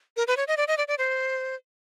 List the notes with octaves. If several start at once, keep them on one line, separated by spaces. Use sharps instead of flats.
A#4
B4
C#5
D#5
D5
D#5
D5
D5
C5